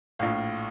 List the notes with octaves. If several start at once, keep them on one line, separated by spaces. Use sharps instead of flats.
A#1 A2 F5